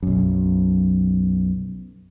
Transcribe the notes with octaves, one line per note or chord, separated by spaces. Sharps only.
B1 F#2